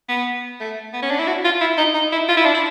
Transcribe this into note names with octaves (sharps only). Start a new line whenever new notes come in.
B3
A3
B3
C#4
D4
E4
F#4
F4
E4
D#4
D#4
E4
F4
E4
D4
E4